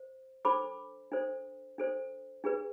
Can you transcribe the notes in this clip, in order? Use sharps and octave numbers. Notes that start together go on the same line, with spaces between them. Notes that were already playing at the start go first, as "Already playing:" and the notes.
Already playing: C5
D4 A4 C5 B5 D6
D4 A4 C5
D4 A4 C5
D4 G#4 B4